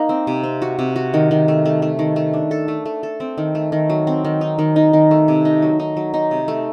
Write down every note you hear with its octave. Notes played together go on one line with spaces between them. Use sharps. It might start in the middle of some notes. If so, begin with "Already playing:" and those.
Already playing: A#3 D#4
C4
C3
C4
F#4
C3
F#4
D#3
D#3
A3
A3
A3
D#3
A3
D4
A4
A3
A3
A4
C4
D#3
A3
D#3
F#3
C4
D#3
D#4
D#3
D#4
D#3
A3
C3
D#4
F#3
D#4
F#3
D#4
C3
A3